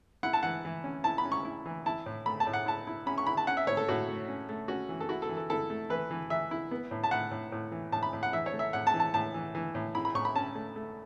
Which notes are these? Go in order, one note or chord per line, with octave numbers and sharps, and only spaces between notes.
E4 F#5
A5
E3 F#5
E3
C#4
E4 A5
B5
C#4
C#6
E4
E3
E4 A5
A2
A3 B5
A5
A2
F#5
E4 A5
E4
C#4 B5
C#6
E4 B5
A5
C#4 F#5
E5
A2 C#5
A4
A2 F#4
A3
C#4
A3
C#4 F#4
E3
A4
E4 F#4
A4
E3
A4
E4 A4
A3
E3 B4
E3
E3 E5
E4
B3
A2
A5
A2 F#5
A2
A2
E3
A2 A5
B5
A2
F#5
E3 E5
C#5
A3
E5
A2 F#5
A5
E3
A5
A2 A5
E3
E3
A2
E4 B5
B5
A2 C#6
B5
C#4 A5
A3
A3